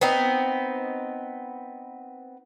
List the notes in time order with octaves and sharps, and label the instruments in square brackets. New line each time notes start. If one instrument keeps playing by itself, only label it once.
[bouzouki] B3 C4 D#4